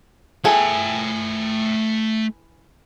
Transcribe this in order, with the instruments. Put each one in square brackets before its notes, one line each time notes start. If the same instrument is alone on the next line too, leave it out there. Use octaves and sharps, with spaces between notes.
[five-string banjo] E3 G#4 A4 [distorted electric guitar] A3 G5